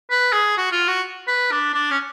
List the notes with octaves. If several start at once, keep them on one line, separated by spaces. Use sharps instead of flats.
B4
G#4
F#4
F4
F#4
B4
D4
D4
C#4